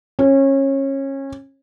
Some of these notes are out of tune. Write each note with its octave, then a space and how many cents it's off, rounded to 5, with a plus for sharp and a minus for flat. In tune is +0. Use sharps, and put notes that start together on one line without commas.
C#4 -25